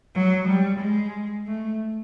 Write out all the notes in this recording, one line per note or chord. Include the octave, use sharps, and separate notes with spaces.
F#3
G3
G#3
A3